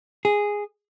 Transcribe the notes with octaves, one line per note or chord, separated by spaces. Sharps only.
G#4